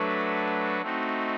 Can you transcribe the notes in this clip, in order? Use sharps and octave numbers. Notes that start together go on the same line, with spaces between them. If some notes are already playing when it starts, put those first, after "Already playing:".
Already playing: F#3 A3 D4 F#4 B4
A3 C4 D#4 F#4